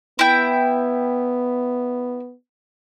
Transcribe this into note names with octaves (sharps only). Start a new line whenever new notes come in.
B3 E4 E5 G5